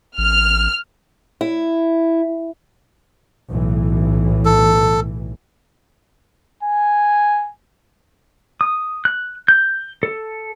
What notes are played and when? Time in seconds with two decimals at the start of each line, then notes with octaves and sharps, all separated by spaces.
0.18 A1 F6
1.41 E4
3.48 B1 A2 E3
4.45 A4
6.63 G#5
8.61 D#6
9.05 F#6
9.48 G6
10.03 A4